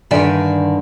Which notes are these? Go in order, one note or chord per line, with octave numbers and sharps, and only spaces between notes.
G2 D3 D#3 D5 E5 G#5